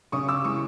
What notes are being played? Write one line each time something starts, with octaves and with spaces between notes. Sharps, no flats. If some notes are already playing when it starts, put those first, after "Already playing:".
C#3 C#6 D#6
D6 E6
E3 G#3 C#6 D#6